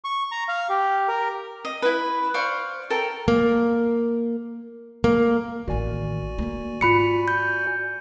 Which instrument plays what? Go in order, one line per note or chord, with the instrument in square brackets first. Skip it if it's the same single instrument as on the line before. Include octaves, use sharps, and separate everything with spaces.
[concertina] C#6
A#5
F5
G4
A#4
[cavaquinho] D#5
E4 B4
C5 D5 F5 C#6
A4 A#4 G5
[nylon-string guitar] A#3
A#3
[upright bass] A1 D#3 [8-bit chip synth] F#4 D5 G#5
[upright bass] D3 A#3
[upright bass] G#2 [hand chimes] F4 B5 C#7
[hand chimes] G6